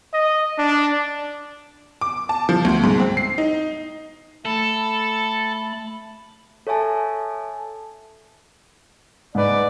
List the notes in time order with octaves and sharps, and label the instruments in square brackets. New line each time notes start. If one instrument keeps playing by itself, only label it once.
[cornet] D#5
D4
[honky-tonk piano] D6
A5
F3
D2
G#2
C4
C7
D#4
[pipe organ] A3 B5 [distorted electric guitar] A4
[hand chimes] A4 C#5 E5 G#5 A5
[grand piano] G#2 B4 [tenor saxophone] D5